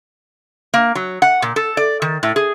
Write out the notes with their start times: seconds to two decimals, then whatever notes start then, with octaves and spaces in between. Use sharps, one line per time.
0.74 A#3
0.95 F#3
1.22 F#5
1.42 A#2
1.56 A4
1.77 D5
2.02 D#3
2.23 A2
2.36 G#4